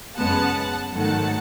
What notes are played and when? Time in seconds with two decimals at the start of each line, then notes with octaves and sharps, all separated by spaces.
0.16 F#2 C#3 G#3 B3 F#5 A5
0.93 G#2 D#3 F#3 A3 F#5 A5